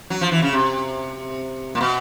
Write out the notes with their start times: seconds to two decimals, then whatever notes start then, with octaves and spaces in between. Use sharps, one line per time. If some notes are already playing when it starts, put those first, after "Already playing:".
0.10 F#3
0.21 F3
0.32 E3
0.42 C#3
0.53 C3
1.75 A#2
1.81 B2